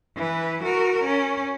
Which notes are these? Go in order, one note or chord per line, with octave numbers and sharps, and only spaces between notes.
E3 B4
F#4 A#4
C#4